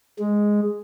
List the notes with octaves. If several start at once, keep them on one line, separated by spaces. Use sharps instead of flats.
G#3